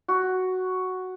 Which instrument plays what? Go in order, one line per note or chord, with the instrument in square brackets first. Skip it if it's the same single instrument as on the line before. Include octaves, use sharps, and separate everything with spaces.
[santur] F#4